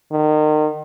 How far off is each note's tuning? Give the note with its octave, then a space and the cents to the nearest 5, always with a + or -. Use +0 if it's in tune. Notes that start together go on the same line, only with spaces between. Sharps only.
D#3 -30